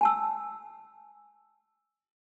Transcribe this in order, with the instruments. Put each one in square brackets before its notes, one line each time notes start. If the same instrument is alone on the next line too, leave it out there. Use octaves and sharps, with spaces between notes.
[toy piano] G#5 A5 E6